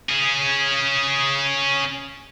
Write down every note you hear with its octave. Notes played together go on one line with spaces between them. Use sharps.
C#4 G#4